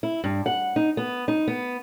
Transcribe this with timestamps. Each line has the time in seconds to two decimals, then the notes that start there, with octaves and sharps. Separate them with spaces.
0.03 E4
0.24 G2
0.46 F#5
0.76 D#4
0.97 B3
1.28 D#4
1.48 B3